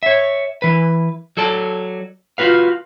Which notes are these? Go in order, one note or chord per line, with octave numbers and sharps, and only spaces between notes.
C#5 E5
E3 B4
F#3 A4 D5 A5
F4 F#4 B4 F5